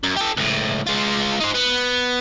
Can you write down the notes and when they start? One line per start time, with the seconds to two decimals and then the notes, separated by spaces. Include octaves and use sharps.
0.04 F#2
0.17 G4 A4
0.37 C#2 A2
0.87 G#3 F4
1.40 D#4 C5
1.54 B3